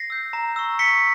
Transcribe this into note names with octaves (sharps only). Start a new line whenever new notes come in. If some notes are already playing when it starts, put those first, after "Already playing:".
Already playing: A#6 C7
E6 G6
A#5
C#6 E6
C#6 B6 C#7